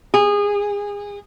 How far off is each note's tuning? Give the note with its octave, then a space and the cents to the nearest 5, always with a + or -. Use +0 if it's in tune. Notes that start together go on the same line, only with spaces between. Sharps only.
G#4 -25